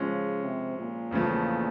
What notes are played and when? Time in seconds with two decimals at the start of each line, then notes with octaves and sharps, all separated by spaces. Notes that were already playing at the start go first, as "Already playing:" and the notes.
Already playing: C#3 F3 G#3 C#4
0.43 C3
0.78 A#2
1.11 E2 C#3 F3 A3